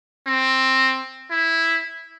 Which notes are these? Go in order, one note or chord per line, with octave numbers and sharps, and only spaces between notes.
C4
E4